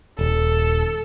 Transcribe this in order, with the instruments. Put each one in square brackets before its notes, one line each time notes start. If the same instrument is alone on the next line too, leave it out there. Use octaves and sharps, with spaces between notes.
[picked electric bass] D#1 [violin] A4